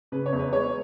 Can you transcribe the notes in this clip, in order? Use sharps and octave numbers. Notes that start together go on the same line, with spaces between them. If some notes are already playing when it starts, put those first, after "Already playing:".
C#3 B4
C#5
E2
B4
G#3 C#5